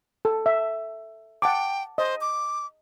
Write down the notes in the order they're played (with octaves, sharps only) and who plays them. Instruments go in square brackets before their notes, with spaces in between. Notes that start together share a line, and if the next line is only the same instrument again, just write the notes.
[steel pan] A4
E5
[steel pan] F#5 A5 D6 [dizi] G5
[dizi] C5 [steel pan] D#5
[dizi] D6